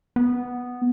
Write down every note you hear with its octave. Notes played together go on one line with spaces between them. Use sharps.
B3